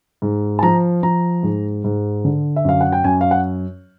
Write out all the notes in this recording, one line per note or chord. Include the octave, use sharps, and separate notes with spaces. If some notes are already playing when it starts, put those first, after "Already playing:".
G#2
A5
F3 A#5
F3 A#5
G#2
G#2
D3
E5
F#2 F5
F#5
G5
F#2 G#5
F5
F#5